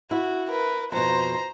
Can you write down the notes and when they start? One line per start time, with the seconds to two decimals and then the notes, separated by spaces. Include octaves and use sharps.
0.11 E4 F#4
0.51 A#4 B4
0.92 F2 B2 C5 A#5